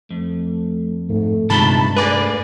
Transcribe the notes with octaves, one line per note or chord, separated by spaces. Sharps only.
F2 A3
G#2 A3
C2 G2 A#2 D#3 G#3 A5 B5
A3 A#3 G#4 B4 D5